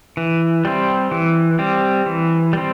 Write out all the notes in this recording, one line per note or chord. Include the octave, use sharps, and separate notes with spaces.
E3
G3 C4
E3
G3 C4
E3
G3 C4